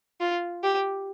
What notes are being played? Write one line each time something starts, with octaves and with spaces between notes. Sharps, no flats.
F4
G4